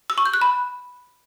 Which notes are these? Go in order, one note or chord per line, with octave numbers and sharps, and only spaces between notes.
E6
C#6
G6
F#6
B5